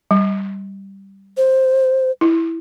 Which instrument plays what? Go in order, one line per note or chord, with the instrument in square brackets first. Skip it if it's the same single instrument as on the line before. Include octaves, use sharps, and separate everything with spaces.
[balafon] G3
[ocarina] C5
[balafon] E4